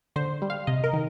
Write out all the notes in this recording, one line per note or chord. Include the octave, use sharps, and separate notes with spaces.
D3 C5
G3
F5
C3 D#5
A#4
D#3